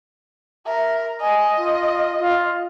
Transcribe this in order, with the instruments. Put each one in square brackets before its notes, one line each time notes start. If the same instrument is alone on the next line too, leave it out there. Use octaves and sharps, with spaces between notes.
[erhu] A#4 [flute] E5
[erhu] D#5 [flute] G#5
[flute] F4
F4